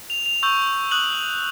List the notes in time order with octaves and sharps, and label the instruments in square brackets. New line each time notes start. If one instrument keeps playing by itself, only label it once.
[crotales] F7
F7
C#6 E6 G6
D#6 F#6 F#7